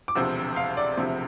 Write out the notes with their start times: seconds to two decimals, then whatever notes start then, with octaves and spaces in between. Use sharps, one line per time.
0.08 D6
0.15 E1 D2 C3 F3 C4 E6
0.56 F5
0.77 D5
0.97 E1 D2 C3 F3 C4 E5